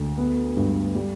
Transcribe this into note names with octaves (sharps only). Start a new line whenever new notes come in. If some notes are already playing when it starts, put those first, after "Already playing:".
Already playing: D2
B3
G2
G3